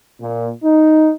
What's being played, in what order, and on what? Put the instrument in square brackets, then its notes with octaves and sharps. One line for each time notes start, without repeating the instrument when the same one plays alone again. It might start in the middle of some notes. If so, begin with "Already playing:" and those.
[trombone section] A#2
D#4